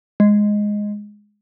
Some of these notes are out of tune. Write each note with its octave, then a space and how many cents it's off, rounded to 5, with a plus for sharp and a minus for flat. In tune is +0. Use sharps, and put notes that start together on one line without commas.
G#3 +0